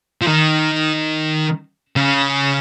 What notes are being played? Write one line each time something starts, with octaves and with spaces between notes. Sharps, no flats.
F3
D#3
C#3